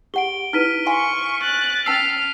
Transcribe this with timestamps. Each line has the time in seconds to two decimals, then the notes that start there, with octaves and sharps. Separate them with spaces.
0.14 G4 F#5 D7 G7
0.53 D#4 E4 B4 F6 B6 D#7
0.87 F5 G#5 C6 C#6
1.43 F#6 A6
1.86 C#4 A5 E6 F6 B6 C7